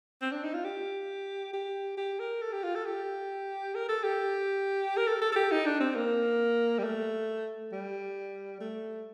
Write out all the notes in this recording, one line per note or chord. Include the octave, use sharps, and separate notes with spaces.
C4
D4
D#4
F4
G4
G4
G4
A#4
A4
G4
F4
A4
G4
A#4
A4
G4
A#4
A4
A4
A4
G4
D#4
D4
C4
A#3
G3
A3
G3
A3